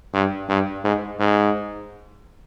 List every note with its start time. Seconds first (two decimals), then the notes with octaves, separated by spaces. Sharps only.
0.14 G2
0.49 G2
0.84 G#2
1.19 G#2